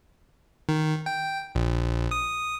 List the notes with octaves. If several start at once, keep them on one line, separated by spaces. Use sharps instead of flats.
D#3
G5
A#1
D#6